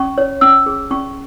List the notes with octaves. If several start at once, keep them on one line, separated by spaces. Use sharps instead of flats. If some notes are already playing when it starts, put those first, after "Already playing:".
Already playing: C#4 C#6
C#5
C#4 E6
G#4
C#4 C#6